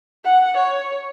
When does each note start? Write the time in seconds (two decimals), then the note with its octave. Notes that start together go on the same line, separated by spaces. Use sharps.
0.25 F#5
0.57 C#5